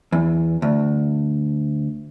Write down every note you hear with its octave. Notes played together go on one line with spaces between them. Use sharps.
E2
D2